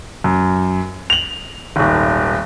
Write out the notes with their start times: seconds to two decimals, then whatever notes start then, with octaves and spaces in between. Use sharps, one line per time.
0.24 F#2
1.10 F7 F#7
1.76 D#1 G#1